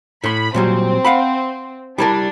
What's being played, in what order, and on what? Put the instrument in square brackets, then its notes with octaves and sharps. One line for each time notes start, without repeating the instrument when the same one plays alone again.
[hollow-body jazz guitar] A2 C6 [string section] B5
[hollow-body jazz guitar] A#2 F#3 G3 [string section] C4
[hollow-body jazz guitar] F5 F#5 B5
[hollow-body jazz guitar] G3 E4 A#4 [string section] D4